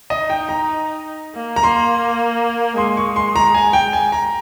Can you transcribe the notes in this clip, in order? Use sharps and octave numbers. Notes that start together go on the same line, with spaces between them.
D#5
D#4
G5
A#5
A#3
A#5
A#3 C6
G#3 C6
C#6
C6
A#5
G#5
G5
G#5
A#5